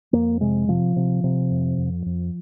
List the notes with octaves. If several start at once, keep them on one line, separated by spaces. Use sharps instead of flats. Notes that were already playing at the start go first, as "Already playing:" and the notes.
F2 A#3
C3 G#3
C3 F3
C3
C3
F2
F2
F2